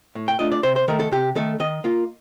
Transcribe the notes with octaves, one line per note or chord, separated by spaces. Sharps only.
A2
G5
A3 D4 F4 D#5
D5
C3 C5
C5
D#3 A3 A#4
A4
C3 G4
D#3 A3 A4
D#3 D#5
A#3 F4